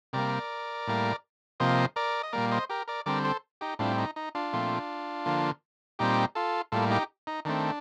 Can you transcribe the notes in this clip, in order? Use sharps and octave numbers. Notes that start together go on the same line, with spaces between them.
C3 G3 A#3 A#4 D5
A2 G3 A#3
C3 F3 A#3 C5 D#5
A#4 D5
D#5
A#2 G3 A#3 A#4 D5
C5 D#5
G4 A#4
A#4 D5
D3 G3 C4 A#4 D5
A4 C5
D#4 G4
A2 G3 C4 D4 F4
D#4
D#4
D4 F4
A#2 F3 A3 C4
D3 F3 A#3
A#2 G3 C4 D#4 G4
F4 A4
A2 G3 A#3 F4 A4
D#4 G4
D#4
D#3 A3 C4 D4